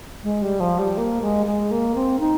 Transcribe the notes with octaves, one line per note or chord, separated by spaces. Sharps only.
G#3
G3
F3
G3
A#3
G#3
G#3
A#3
C4
D#4